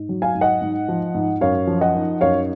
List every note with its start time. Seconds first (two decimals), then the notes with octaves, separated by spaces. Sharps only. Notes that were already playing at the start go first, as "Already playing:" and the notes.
Already playing: G#2
0.09 F#3
0.22 F5 G#5
0.35 G#2
0.41 D#5 F#5
0.61 G#2
0.89 F3
1.15 G#2
1.41 F#2 C#5 F5
1.67 F3
1.81 D#5 F#5
1.94 D#4
2.21 F#2 C#5 F5